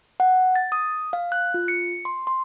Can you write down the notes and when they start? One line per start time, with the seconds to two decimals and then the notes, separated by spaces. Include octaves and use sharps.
0.20 F#5
0.56 A6
0.72 D#6
1.13 F5
1.32 F#6
1.54 F4
1.68 C#7
2.05 C6
2.27 C6